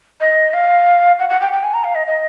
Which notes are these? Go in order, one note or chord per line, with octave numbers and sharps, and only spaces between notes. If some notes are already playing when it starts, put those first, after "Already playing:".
D#5
F5
F#5
F#5
G5
G5
G#5
A#5
F5
D#5
D#5